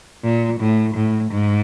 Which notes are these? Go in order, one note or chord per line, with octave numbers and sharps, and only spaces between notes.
A#2
A2
A2
G#2